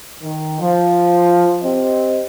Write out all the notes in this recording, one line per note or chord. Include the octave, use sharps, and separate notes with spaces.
D#3
F3
C4 G4 D#5